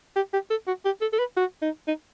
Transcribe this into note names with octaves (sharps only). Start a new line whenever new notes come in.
G4
G4
A4
F#4
G4
A4
A4
B4
F#4
D#4
D#4